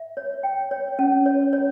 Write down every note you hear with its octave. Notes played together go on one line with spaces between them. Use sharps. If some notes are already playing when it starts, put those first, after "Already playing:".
Already playing: E5
C#5
G5
C#5
C#4
C#5
C#5